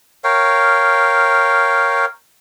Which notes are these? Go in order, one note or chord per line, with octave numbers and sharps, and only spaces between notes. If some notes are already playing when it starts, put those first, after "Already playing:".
A#4 C#5 F5 G5